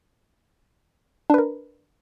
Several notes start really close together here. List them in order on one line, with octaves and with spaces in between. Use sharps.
D4 B4 A#4